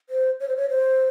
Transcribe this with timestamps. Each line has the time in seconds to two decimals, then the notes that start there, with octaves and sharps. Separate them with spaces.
0.10 C5
0.40 C#5
0.48 C5
0.56 C#5
0.70 C5